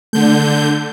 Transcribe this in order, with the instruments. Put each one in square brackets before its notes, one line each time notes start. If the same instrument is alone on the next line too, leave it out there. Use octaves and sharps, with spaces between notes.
[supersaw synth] D3 G6 [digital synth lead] A3